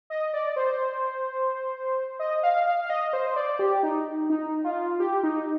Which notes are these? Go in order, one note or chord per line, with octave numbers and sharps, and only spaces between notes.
D#5
D5
C5
D#5
F5
F5
F5
D#5
C5
D5
G4
D#4
D#4
F4
G4
D#4